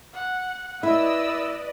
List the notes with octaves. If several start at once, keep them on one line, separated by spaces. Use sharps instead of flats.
F#5
E4 B4 D5 D#5 E6